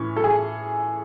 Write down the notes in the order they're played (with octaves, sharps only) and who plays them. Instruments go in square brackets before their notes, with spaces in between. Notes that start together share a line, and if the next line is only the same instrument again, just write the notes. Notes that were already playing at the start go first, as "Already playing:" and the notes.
Already playing: [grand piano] A2 E3 C#4
[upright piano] A4
G#4